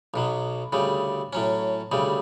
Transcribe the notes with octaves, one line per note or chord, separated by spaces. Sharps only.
B1 B2 F#3
D2 C#3 G3
A2 F#3 C#4
D2 C#3 G3